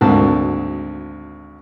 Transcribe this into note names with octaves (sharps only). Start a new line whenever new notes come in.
G#1 D2 G#2 A#3 A5